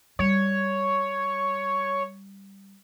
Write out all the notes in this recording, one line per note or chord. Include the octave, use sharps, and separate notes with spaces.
G3 C#5